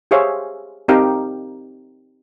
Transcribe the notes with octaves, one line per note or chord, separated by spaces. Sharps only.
G4 G#4 C5 C#5 E5 F5
C4 D#4 G4 A#4 F5 G5